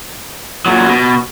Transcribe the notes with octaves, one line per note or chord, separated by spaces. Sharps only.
A#2 F#3
B2